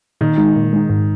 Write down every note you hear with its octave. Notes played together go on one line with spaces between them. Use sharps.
A#2 D#3
G#3 D#4
A#2
G#3 D#4
G#2